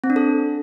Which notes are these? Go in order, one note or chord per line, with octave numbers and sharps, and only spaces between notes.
C4
D4
A4